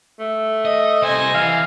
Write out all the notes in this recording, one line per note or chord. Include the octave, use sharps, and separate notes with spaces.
A3
D#5
C2 C5 D#5 G#5
E3 F5